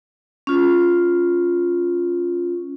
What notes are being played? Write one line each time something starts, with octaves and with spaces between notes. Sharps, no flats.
C#4 F4